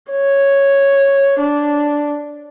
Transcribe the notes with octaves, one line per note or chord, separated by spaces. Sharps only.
C#5
D4